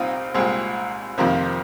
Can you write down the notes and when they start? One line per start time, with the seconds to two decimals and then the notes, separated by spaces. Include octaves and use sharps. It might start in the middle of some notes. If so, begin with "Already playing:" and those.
Already playing: C2 A#2 C4 D#4 F4
0.34 C2 A#2 G#3 C4
1.18 F2 C3 D#3 F3 A#3